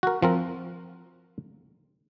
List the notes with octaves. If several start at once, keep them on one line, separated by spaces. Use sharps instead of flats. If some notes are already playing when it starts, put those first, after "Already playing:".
F#4 A#4
F3 C4 A#4